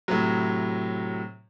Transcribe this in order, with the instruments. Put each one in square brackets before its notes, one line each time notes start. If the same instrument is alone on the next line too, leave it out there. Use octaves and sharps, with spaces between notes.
[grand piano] A2 C3 F#3